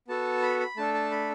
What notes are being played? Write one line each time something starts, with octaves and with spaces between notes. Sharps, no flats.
B3 F#4 A4 A5
B5
B5
A3 D4 A4 A5
A5
B5